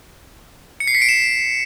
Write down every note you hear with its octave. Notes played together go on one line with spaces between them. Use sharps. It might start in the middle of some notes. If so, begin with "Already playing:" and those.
C#7
C7
B6
D7
E7